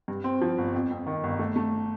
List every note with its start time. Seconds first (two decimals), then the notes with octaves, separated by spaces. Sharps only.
0.08 G2
0.24 C4
0.42 F3
0.58 G1
0.74 F2
0.91 F2
1.07 D#3
1.24 G1
1.39 A3
1.56 A3